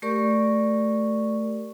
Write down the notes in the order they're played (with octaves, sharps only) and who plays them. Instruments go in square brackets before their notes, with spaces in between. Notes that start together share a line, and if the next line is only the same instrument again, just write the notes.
[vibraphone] A3 G4 A#4 D5 C#6